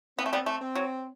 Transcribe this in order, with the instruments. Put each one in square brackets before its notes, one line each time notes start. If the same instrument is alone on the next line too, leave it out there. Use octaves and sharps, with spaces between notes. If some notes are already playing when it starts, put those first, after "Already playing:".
[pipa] B3 [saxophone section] C4
[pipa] A3
G3 B3
A3
[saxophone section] C4
[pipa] F#3